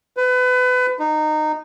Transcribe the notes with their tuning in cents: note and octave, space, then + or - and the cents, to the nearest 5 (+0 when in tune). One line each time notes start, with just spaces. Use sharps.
B4 +30
D#4 -20